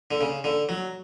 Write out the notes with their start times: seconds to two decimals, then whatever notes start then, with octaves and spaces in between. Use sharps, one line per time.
0.11 D3
0.21 C#3
0.44 D3
0.69 F#3